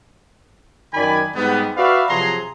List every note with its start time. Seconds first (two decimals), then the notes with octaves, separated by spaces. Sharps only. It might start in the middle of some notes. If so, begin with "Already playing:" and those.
0.93 F#2 D#3 D5 G#5 B5
1.35 G#2 G3 B3
1.77 F#4 B4 D5 E5 F5
2.08 C3 F3 F#3 G#4 A#5 C6